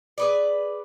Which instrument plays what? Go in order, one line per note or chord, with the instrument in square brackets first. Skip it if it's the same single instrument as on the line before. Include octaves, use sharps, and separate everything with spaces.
[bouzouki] G#4 B4 D5